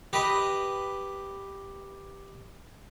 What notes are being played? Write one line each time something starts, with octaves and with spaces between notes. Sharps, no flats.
G4 B4 D#5